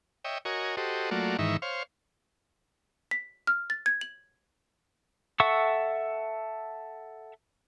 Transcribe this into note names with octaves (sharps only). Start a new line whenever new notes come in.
C#5 D#5 E5 G5
F#4 A#4 C#5 D#5 G#5
F#4 G4 A4 C5 D#5
F#3 A3 A#3 F4 F#4 D5
G#2 D#3 E3 D#4 E5 C#6
C5 C#5 F5
B6
F6
A6
G#6
F#7
A4 E5 F#5 C#6 E6